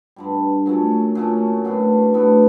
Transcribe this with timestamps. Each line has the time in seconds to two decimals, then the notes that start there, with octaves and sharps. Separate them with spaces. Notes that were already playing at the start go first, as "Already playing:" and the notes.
0.16 G2 D3 G3
0.66 A#2 F#3 A3 C#4
1.15 A#2 F#3 A3 C#4
1.65 A2 F#3 B3 D4
2.14 A2 F#3 B3 D4